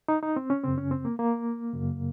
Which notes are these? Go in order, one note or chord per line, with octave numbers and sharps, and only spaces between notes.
D#4
D#4
C4
C#4
F#2 C#3 C4
C#4
C4
A#3
A#3
F#2 C#3